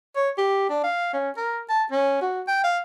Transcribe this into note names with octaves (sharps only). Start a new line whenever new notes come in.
C#5
G4
D4
F5
C#4
A#4
A5
C#4
F#4
G5
F5